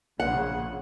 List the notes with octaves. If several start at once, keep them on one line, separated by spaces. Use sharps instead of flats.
A#1 A#2 C#3 F#5